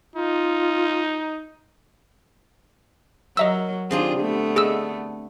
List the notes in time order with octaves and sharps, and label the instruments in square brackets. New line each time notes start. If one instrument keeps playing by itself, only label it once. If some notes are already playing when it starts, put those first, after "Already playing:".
[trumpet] D#4 [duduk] F4
[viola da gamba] F#3 [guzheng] A#4 [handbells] D#5 E5 E6
[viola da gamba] D#3 F4 G#4 [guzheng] C4 D4 G4
[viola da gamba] D3 A3 B3
[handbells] G#4 E6 [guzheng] D#5 E5